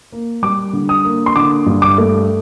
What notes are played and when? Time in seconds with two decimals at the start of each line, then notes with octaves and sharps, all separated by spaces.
0.12 A#3
0.43 G3 D6
0.73 D3
0.89 D#6
1.05 A#3
1.26 C6
1.36 D3 D6
1.66 G2
1.82 D6
1.98 A3